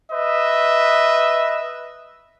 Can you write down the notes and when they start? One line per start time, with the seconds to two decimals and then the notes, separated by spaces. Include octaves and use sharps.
0.12 B4 D#5 E5